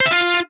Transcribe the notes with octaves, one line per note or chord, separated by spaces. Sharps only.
C5
E5
F4